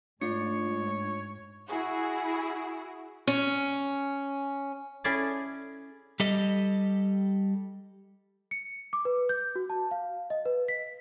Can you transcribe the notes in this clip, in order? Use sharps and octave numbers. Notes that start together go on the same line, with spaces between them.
G#2 A3 D4 F4 C#5 C#7
E4 F#4 G#4
C#4
C#4 E4 G#4 A4 D5
G3 G4 A4 D#5
C#7
D6
B4
G6
F#4
A5
F5
D#5
B4
B6